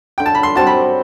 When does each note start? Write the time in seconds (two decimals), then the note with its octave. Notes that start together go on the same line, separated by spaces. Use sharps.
0.18 D3 G5
0.26 A5
0.35 B5
0.43 C6
0.55 G3 C4 F#4 A5
0.67 B5